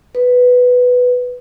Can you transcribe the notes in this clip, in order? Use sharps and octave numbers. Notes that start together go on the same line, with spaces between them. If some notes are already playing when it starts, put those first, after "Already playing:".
B4